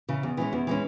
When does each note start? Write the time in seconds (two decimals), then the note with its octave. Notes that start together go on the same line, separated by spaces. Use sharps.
0.09 C#3 E3
0.23 E2
0.37 E3 G#3 C#4
0.53 E2
0.67 E3 G#3 C#4